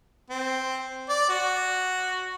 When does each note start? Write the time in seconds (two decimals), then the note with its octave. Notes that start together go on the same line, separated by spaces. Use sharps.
0.30 C4
1.09 D5
1.29 F#4